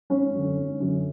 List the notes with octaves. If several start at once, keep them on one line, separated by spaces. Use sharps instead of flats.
G#1 C#4
F#2
D3
G#1
F#2 D3